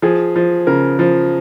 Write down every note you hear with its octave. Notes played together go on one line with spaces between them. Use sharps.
F3 G#4
F3
C#3 A#4
F3